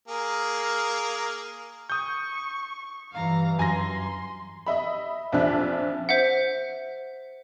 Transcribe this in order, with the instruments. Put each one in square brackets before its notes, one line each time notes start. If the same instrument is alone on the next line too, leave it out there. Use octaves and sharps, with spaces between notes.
[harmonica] A#3 G#4 A#4
[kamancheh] C#6 [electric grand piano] D#6 G6
[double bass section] G2 E3 [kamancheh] F5 A#5
[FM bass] F#2 [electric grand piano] G#5 A#5 A#6 [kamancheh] C6
[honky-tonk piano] D#5 E5 B5
A#1 F2 F3 D4 E5 F#6
[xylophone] C5 E5 F#5